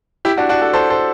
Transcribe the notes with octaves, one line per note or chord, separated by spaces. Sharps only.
E4 G4
D4 F#4
D4 F#4
F#4 A4
A4 C5
A4 C5